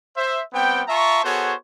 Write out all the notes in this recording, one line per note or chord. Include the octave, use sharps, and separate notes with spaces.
C5 E5
G3 B3 C4 G5
F4 E5 A5 A#5 C#6
B3 F#4 G#4 A4 C5 C#5